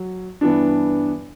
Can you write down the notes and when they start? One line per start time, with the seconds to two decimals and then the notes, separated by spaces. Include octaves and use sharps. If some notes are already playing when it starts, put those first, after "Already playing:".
Already playing: F#3
0.41 G2 E3 B3 D4